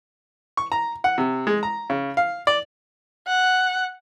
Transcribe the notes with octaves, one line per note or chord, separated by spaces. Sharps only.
C#6
A#5
F#5
C3
G#3
A#5
C#3
F5
D5
F#5